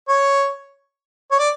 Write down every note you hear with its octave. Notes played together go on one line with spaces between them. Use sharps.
C#5
C#5
D5